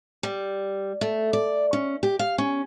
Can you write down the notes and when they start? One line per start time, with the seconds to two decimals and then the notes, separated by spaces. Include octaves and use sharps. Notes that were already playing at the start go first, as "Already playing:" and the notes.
0.23 G3
1.01 A3
1.33 D5
1.73 C#4
2.03 G4
2.19 F5
2.38 C#4